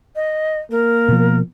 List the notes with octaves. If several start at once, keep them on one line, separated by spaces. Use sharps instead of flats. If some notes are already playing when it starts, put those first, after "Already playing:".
D#5
A#3 A#4
B2 F3